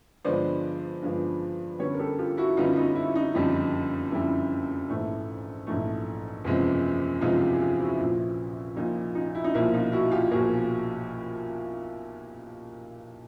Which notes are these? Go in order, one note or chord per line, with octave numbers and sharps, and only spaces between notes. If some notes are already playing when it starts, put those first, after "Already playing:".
G2 D3 F3 G#3 B3 C5 D5
G2 D3 F3 G#3 B3
F#2 D3 G3 B3 B4 C#5
A#4
G4 A4
F4 G4
E4 F#4
F#2 D3 G3 B3 D#4 F4
D#4 F4
E4
D#4
F#1 F2 D3 G3 D#4
F#1 F2 D3 G3 E4
A#1 G#2 E3 A3
A#1 G#2 E3 A3
F#1 E2 C3 F3 G#3
F#1 E2 C3 F3 G#3 D#4 F4
F4 G4
G#4
F4 G4
E4 F#4
A#1 A#2 F3
A#1 A#2 F3 D#4 F4
D#4
E4
D#4
B1 A#2 F3 A#3 E4
D#4 F4
E4 F#4
F4 G4
B1 A#2 F3 A#3 F#4 G#4